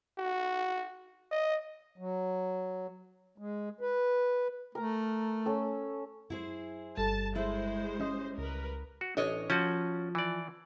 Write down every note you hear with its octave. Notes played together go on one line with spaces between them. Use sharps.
F#4
D#5
F#3
G#3
B4
A3 A#4 A#5
C#4 A4 E6
F#2 E4 G#4 C5
G1 G3 A4 A5
G#3 E4 C5 E5 C6
G3 C#4 D#5
C#2 A#4 B4
F#4
A1 D4 C#5 D#5
F3 C#4 F#4
E3 D5